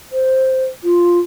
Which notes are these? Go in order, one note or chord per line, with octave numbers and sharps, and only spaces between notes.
C5
F4